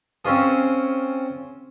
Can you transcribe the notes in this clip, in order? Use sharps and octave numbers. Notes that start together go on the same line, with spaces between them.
C4 C#4 F4 G#4